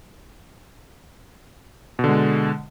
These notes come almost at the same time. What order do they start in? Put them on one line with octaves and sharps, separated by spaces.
B2 D3 G#3